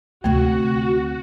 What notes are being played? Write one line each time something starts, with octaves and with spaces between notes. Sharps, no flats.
D2 C3 A3 F#4